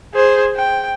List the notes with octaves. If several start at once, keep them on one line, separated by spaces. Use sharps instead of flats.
G#4 C5
G5